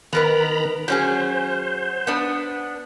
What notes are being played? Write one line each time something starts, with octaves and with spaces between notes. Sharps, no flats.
D#3 B3 A#4 B4 A#5 B5
F#3 C#4 G#4 C5
B3 D4